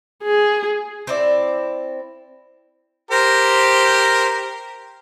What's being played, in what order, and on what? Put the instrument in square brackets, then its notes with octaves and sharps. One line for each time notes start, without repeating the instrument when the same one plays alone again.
[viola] G#4
[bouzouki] C4 E4 D5
[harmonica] G4 A#4 [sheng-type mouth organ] C5 A#5